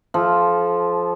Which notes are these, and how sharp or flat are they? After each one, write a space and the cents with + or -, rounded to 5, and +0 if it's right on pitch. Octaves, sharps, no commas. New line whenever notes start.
F3 +0 A4 -30